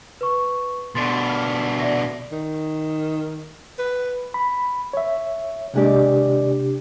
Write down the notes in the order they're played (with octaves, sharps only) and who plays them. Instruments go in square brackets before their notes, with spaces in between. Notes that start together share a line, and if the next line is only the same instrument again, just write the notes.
[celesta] B4 C#6
[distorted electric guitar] B2 D3 [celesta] C6 A6
[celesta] F6
D5 E5 A#6
[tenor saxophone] D#3
B4
[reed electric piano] B5
C#5 E5
[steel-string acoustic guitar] D#2 G#3 D5 [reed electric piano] C3 D4 G4